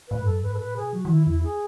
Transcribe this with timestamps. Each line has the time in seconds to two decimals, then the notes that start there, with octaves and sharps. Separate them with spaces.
0.08 A2 B4
0.19 G#2
0.25 F#2 A4
0.42 G#2 B4
0.54 A4
0.59 A2 B4
0.76 B2 G#4
0.93 F#3 F#4
1.05 E3
1.09 D#3 E4
1.27 E2 E4
1.43 G#4